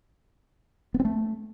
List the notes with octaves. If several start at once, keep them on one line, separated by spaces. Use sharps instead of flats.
B3
C4
A3